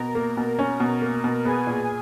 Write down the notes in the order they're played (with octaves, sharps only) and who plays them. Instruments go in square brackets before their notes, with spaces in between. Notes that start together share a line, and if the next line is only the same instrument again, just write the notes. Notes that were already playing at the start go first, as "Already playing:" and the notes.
Already playing: [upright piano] B2 [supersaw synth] A#4 A#5
[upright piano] A#3
B2
C#4
B2
A#3
B2
[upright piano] B3 [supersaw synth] G#4 G#5
[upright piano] A#2